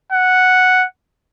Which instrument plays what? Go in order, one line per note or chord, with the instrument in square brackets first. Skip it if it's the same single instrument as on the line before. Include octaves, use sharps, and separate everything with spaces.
[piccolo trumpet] F#5